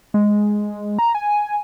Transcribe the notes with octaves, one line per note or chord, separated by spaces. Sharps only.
G#3
A#5
G#5